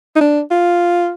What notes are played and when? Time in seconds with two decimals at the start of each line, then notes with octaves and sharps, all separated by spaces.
0.16 D#4
0.21 D4
0.51 F4